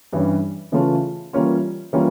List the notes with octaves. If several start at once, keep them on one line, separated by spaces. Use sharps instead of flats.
G2 E3 G3 C#4
C#3 E3 A3 C#4 F4
E3 G3 A#3 C#4 F4
E3 G3 A#3 C#4 F4